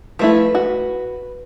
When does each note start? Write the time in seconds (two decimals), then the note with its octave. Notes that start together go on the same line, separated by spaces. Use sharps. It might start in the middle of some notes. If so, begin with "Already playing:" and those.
0.19 F3 A3 E4 B4
0.55 F#4